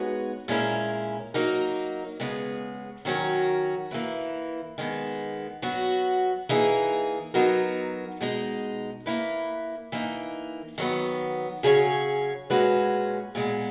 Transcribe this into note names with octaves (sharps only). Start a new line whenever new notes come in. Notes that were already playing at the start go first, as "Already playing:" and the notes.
Already playing: G#3 B3 D#4 F#4 C#5
A#2 G#3 C#4 E4 A#4
F#3 A#3 D#4 A#4
C#3 G#3 B3
D#3 F#3 C#4 F#4 A#4
E3 A#3 E4 B4
D#3 G#3 B3
F#3 B3 F#4
E3 A#3 D#4 G#4
F#3 B3 D#4 F#4 A#4
B2 G#3 D#4
A#3 E4 B4
E3 A#3 D#4
D#3 F#3 B3
C#3 F#3 C#4 G#4 C#5
A#2 G#3 C#4 F#4 B4
A#2 G#3 B3